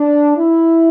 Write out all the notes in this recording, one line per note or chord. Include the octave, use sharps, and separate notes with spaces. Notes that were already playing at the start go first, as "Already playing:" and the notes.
Already playing: D4
E4